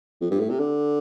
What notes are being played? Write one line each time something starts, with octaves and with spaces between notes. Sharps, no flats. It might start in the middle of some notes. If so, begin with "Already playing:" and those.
F2
G2
A2
C3
D3